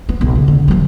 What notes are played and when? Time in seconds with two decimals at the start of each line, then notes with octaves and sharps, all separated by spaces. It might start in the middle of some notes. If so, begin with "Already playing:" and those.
0.09 B3
0.21 B1
0.35 C#3
0.48 D3
0.68 E3 F#3